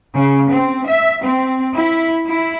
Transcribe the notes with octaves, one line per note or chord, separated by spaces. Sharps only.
C#3
C4
E5
C4
E4
E4